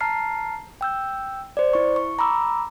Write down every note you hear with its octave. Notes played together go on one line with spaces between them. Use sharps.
A5 A#5 F6 C7
G5 E6 G6
C5 D5
E4 C#6
C#6
A#5 B5 D6 E6